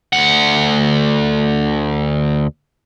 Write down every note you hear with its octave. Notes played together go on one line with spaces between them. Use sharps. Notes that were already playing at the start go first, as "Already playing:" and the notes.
D2 F#5